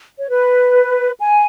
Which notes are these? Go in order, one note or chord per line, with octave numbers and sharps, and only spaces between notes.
C#5
B4
G#5